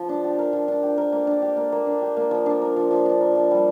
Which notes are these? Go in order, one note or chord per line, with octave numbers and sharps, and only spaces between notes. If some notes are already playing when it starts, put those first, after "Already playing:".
Already playing: F3
D4
G4
A#4
F3
D4
G4
A#4
A#3
D4
G4
A#3
A#3
D4
G4
A#3
F3
D4
A#4
F3
F3
D4
A#4
F3
G3